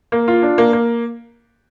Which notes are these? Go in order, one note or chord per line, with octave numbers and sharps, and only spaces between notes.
A#3
F4
D4
A#3
A#3